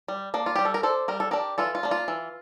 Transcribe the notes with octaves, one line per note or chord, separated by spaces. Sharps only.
G3
A#3 D4
F4
G3 G4
A4
A#4
D4 A4 C5
G3 A#4
A4
D4 G4 A#4
E3 F4 A4
F4
A#3 D4
F4
E3